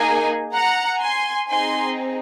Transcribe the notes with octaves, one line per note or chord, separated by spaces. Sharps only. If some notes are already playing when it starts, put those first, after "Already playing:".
Already playing: A#3 D#4 G#4 G#5
F#5 A#5
G#5 C6
C4 D#4 G#4 G#5 C6